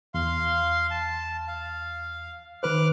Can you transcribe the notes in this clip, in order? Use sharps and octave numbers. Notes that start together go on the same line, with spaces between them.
E2 F5 C6
A5
F5
D#3 B4 C5 D6 F6 F#6